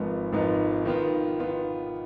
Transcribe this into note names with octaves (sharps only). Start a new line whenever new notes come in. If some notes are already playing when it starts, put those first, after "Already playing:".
Already playing: G#1 G#2 F3 B3 D#4
G#1 G#2 F3 B3 D#4
D#3 B3 F4
D#3 B3 F4